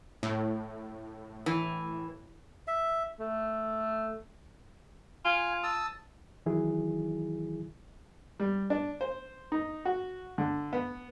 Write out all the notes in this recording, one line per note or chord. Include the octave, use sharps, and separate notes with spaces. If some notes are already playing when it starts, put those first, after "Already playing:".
A2
E3
E5
A3
F4 G#5
A5 D#6 E6
D#3 E3 F#3 E4 G#4
G3
D4
C5
D#4
F#4
D3
B3